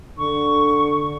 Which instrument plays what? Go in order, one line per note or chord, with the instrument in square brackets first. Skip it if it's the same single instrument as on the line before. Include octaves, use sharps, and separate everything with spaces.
[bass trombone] D3 [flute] C#6